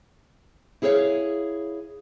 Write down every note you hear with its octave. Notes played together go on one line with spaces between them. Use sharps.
E4 G#4 A4 B4 C#5 F5